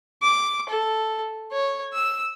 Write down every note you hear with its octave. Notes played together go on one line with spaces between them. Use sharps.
D6
A4
C#5
E6